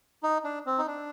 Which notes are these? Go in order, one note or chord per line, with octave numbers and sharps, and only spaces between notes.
D#4
D4
C4
D#4
D4